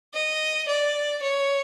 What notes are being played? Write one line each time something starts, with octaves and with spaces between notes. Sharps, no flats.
D#5
D5
C#5